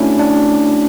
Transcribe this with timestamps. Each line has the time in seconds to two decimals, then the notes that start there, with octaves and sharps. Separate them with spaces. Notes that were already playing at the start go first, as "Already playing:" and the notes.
Already playing: A3 C#4 D4 E4 F#4
0.19 D4